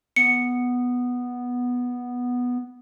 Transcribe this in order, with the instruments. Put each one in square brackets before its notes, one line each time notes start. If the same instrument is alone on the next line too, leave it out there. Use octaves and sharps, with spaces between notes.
[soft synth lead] B3 [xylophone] C#7